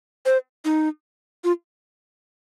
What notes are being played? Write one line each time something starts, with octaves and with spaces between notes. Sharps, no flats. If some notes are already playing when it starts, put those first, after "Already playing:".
C5
D#4
F4